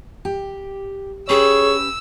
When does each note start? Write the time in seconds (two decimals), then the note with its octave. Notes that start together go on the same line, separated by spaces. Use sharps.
0.25 G4
1.29 C#4 G4 G#4 B4 C#5 E6